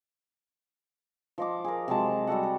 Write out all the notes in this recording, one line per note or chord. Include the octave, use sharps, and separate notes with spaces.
F3 D#5 D6
G#4 A#4
C3 F#3 G#3 A5
G3 F#4 A4 F#5
A4